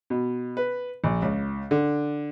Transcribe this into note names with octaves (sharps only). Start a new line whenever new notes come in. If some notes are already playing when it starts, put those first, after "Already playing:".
B2
B4
A#1
C#2
D3